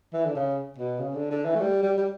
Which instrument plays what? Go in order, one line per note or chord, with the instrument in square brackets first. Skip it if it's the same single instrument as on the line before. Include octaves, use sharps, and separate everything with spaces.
[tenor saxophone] E3
D3
C#3
B2
C#3
D3
D3
E3
A3
G3
G3
G3